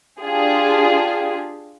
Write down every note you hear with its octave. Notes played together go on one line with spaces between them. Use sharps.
D4 F4 G4 G#4